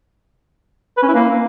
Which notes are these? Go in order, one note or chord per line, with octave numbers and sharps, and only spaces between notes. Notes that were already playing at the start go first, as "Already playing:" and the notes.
B4
C#4
E4
A#3